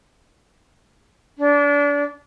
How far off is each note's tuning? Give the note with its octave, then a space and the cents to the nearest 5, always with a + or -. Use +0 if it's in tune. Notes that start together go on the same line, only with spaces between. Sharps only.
D4 -30